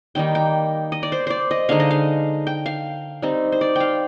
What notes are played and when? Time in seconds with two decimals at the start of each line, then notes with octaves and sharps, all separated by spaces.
0.15 D#3 G3 A#3 D#4 G5
0.35 G5
0.92 D#5
1.03 D5
1.12 C5
1.27 C5 D5
1.51 D#5
1.69 D3 G#3 D#4 F5
1.80 D#5
1.91 F5
2.47 G5
2.66 F5
3.22 G3 C4 D#4
3.52 C5
3.61 D5
3.76 F5 G5